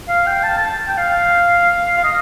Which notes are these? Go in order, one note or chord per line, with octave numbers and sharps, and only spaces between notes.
F5
G5
A5
A5
G5
F5
F5
D#5